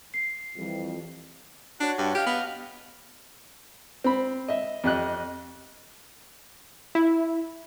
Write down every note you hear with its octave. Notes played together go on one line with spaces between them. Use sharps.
C7
F2 E3 G3
D4 F#4 C#5 F#5
G2
G4 D#5 F5 F6
B3
C4 B5
D#5 E5
F2 G4 D#5 F#6
E4